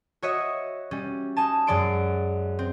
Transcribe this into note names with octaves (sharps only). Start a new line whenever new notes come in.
F#4 C#5 D#5 E5
G3 C#4
D#4 G#5 A5
F#2 F#3 G#3 D5 C6 D7
C4